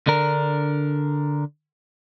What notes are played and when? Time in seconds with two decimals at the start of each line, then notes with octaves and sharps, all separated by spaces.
0.07 D3 D4 A#4